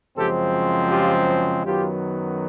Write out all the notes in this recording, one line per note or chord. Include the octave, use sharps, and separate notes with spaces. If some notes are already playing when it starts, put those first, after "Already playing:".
F#2 C#3 F3 G#3 C4 G4 A4
F4 G4
F#2 D#3 F#3 B3 F4 G4